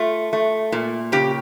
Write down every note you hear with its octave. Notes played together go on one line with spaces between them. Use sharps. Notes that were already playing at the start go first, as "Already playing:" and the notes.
Already playing: A3 F4
A3
A#2
C#3 G4